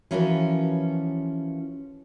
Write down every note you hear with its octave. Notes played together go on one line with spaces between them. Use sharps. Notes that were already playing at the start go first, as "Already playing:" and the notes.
E3 F3 C#4 F#4 A#4 B4